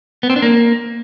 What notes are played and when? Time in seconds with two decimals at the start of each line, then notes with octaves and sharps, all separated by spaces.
0.23 B3
0.30 C4
0.36 D4
0.42 A#3